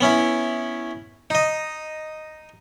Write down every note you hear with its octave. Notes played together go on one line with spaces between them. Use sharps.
B3 C#4 E4
D#4 D#5